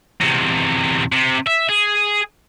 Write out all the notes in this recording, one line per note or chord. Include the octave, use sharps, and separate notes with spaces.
E2 C3
C3
E5
G#4